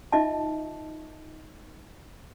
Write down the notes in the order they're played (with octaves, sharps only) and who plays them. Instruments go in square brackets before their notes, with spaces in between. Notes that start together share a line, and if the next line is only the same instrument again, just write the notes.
[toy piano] D#4 F4 D#5 E5 A5